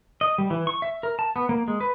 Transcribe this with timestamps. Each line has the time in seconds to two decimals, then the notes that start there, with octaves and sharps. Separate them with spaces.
0.21 D#5
0.38 G3
0.50 E3
0.67 C#6
0.82 E5
1.03 A#4
1.19 A5
1.36 B3
1.49 A#3
1.68 G#3
1.81 B4